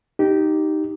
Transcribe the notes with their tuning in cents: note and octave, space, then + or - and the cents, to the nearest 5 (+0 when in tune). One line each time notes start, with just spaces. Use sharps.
D#4 +0 G4 -10